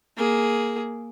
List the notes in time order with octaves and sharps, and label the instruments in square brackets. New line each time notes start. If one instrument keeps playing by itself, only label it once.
[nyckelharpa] A#3 G#4